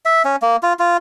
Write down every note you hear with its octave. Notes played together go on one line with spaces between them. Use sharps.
E5
C#4
A#3
F4
F4